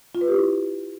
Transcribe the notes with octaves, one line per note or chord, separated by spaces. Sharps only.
F4
B4
G4
E4